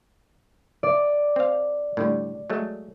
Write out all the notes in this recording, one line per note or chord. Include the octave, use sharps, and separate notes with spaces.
D5
C4 F5
A2 D3 G3
F#3 G#3 A3